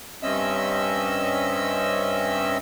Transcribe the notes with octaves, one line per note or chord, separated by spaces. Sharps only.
G2 C4 C#4 D#5 E5 E6